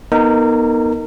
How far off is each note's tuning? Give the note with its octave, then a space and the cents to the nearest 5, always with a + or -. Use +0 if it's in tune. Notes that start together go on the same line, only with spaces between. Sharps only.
B3 -30 D#4 +0 A#4 -30